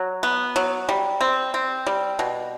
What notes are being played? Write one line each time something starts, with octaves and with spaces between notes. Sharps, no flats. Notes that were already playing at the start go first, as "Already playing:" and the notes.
Already playing: F#3
B3
F#3
G3
C4
C4
G3
B2